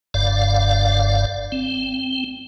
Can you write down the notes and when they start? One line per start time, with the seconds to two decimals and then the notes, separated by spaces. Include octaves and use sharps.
0.14 F#1 G2 D5 F5
1.52 C4